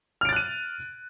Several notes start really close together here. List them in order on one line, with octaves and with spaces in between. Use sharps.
F6 D7 A6 F#6 D#7